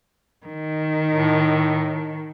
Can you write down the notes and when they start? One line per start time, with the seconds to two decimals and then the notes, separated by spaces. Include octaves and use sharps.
0.47 D#3
1.12 A2